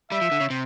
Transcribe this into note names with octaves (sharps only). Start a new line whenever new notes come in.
G3 E5
F3
D3
C#3
C3